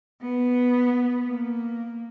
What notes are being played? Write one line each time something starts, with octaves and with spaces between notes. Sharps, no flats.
B3
A#3